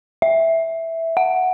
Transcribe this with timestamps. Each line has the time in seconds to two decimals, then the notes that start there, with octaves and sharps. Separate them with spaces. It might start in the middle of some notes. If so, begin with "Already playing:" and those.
0.22 E5
1.17 F#5